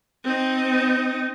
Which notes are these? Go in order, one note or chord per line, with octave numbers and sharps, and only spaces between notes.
C4 D#4